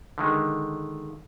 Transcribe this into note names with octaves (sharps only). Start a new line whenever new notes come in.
D3 D#3 G#3